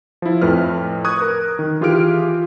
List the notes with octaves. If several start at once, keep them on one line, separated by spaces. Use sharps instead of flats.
F3 E4
F2 A2 B4 F6
C#6 D#6 F#6 G#6
A#4
D#3
E3 F4 G4 G#4 F6 D7